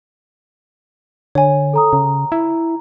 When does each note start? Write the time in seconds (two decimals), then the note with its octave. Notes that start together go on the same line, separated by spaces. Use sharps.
1.35 D3 C#5 G#5
1.73 A4 A#5 D#6
1.93 C#3 A#5
2.32 E4